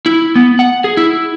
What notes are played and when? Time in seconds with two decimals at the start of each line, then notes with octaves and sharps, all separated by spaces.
0.06 E4
0.36 B3
0.59 F#5
0.84 G#4
0.97 E4